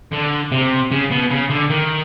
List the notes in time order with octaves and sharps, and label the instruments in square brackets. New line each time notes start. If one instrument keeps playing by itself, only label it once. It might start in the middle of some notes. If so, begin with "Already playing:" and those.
[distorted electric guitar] D3
C3
C#3
B2
C#3
D3
D#3